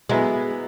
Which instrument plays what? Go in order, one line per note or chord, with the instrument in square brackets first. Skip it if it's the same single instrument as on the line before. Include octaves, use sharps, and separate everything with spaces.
[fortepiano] F#3 B3 E4 B4 [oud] G#3